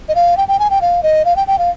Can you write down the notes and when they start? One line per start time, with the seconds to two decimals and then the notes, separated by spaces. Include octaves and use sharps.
0.09 D#5
0.15 F5
0.37 G5
0.48 G5
0.59 G#5
0.70 G5
0.81 F5
1.03 D#5
1.25 F5
1.36 G5
1.47 G5
1.58 F5